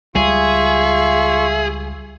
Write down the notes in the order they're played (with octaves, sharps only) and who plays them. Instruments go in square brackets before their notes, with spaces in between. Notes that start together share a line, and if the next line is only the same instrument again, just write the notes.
[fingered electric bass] C#2 G3 [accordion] F4 C#6 [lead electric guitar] G#4 [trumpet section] E5